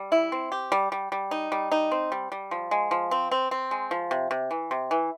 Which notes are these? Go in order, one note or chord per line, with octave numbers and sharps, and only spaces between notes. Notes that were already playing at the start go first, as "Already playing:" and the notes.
Already playing: G3
E4
C4
G4
G3
G3
G3
D#4
G3
D#4
C4
G3
G3
F3
G#3
F3
C4
C4
C4
G#3
F3
C3
C3
E3
C3
E3